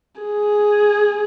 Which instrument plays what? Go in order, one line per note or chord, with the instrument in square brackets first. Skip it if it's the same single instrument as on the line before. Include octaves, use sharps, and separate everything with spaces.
[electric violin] G#4